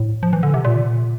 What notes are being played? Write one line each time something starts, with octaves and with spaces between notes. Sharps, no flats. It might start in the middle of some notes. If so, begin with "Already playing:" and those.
Already playing: A2
F3
E3
D3
C3
A#2